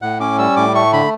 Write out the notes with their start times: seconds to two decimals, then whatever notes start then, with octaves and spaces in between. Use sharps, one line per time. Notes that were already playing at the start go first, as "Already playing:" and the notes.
0.02 A2 F#5
0.20 C#4 D6
0.38 G3 E6
0.56 A2 D6
0.75 A3 C#6
0.93 D3 B5